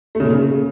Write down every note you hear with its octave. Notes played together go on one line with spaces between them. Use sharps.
A3
C#3
A#2
C#3